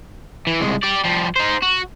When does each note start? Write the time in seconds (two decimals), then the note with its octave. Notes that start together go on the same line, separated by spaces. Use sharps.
0.47 E3
0.60 C2 G#3
0.83 G4 D5
1.04 F3 G3
1.36 D#4 C5
1.63 F#4